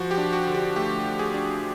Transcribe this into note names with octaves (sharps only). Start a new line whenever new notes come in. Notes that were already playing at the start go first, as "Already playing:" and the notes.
Already playing: F3 F#4
G4
D4
F#4
D3
G4
A3 G4
F3
G#4
D4